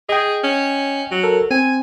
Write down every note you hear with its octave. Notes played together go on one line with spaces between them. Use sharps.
G#4 D#5 G5
C#4
F#3
A4 A#4
C4 G#5